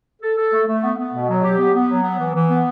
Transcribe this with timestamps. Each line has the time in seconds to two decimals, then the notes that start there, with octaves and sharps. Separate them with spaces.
0.22 A4
0.38 A4
0.52 A3
0.67 A3
0.82 B3
0.98 B3
1.13 B2
1.28 F#3
1.43 G4
1.58 B3
1.74 B3
1.89 F#3
2.03 B3
2.18 E3
2.34 E3
2.49 B3